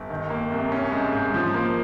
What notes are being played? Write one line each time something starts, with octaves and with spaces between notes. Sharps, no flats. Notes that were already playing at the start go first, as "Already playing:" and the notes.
Already playing: G1
D#3
A#3
C2
C#4
G#2
G#2
F3
A#3